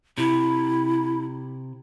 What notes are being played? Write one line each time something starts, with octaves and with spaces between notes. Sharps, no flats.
C3 E4